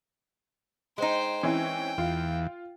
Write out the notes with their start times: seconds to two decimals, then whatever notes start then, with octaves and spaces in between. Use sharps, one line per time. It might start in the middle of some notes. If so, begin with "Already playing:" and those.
0.98 G#3 D#4 C5 G5
1.43 E3 C4 C#4 G5
1.98 E2 F4